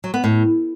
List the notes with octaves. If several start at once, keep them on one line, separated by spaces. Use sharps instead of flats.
F#3
B3
A2